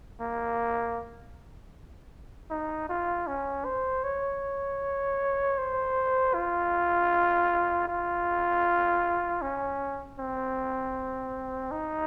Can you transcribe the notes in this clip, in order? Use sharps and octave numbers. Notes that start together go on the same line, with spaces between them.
A#3
D#4
F4
C#4
C5
C#5
C5
F4
F4
C#4
C4
D#4